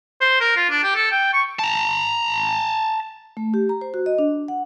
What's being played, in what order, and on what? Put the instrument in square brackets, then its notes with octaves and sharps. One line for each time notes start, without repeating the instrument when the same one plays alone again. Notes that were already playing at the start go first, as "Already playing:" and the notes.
[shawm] C5
A#4
F4
D4
G4
A4
G5
C#6
[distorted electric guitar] A5 A#5
[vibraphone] A3
G4
A#5
C5
F#4
D#5
D4
F#5